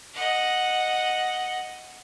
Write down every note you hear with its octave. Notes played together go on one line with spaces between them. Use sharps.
D#5 F#5